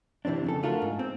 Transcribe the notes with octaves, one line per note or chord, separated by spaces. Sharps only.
C3 E3 G#3 C4 D4
F2 C#3 A4
A3 D4 F4 F#4 A4 A#4
G#2
C4